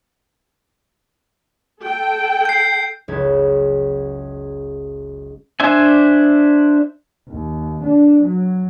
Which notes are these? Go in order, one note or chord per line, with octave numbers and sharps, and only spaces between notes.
A4 G5
G6 C7
F#1 C#2 B4 G#6
D4 C5 E5 G#5
D#2
D4
F#3